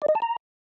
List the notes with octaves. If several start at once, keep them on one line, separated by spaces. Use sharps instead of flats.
D5
D#5
A5
A#5